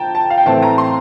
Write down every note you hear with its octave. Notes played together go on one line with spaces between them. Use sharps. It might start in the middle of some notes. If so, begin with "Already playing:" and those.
Already playing: F3 G5 A5 A#5
A5
F5
G5
A2 E3 A3 C4 A5
A#5
C6